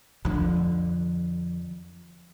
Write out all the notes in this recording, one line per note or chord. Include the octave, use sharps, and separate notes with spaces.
F2 D3